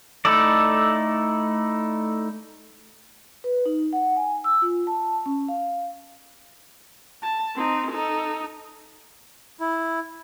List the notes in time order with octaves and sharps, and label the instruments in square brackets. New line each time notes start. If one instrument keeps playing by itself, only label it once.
[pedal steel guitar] A3 D#4 E4 A4 D5
[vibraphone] B4
D#4
F#5
G#5
E6
F4
A5
C#4
F5
[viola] A5
C4 D#4
D#4 A4
[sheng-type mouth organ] E4